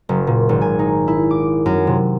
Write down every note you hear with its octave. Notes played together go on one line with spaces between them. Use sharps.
F#1
A#2
G#1
G#5
D#4
E4
D6
F#2
C3